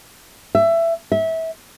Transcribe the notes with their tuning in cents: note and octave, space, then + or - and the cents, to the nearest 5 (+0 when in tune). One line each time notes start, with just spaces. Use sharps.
E5 +20
E5 -25